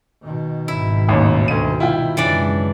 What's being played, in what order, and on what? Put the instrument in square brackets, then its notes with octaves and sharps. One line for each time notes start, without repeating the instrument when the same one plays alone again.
[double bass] B2 D#3
[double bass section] G#1 [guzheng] E4
[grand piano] A1 D#2
D2 D#7
[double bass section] C2 [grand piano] E4 F4 G5
[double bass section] F#2 C#3 G#3 [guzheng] E3 D4 D5